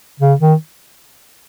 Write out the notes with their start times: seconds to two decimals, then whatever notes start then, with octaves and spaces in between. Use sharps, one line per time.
0.20 C#3
0.40 D#3